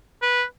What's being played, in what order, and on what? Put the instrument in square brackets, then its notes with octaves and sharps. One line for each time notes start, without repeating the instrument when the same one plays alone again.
[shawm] B4